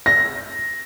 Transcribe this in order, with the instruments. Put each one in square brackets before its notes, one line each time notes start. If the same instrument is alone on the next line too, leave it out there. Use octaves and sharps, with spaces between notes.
[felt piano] A#6